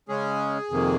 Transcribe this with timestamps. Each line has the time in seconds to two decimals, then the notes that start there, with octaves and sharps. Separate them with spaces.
0.09 C#3 G#3 C#4 G#4
0.70 F2 C3 D#3 A#3